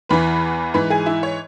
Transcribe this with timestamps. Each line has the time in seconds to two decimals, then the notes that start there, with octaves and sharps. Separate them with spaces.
0.09 E2 E3 B4 B5
0.74 G#2 E3 B4 B5
0.90 G#4 G#5
1.06 E4 E5
1.23 C#5